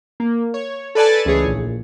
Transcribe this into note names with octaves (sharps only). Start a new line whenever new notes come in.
A#3
C#5
A4 B4 D5 G#5 A5
C#2 E3 A3 G#4 C#5
A#1